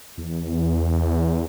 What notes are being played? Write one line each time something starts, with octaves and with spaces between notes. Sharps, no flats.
E2